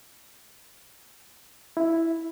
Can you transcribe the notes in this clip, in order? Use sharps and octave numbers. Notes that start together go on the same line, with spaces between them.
E4